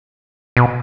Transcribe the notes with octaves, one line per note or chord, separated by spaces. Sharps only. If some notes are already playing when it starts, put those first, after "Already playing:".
B2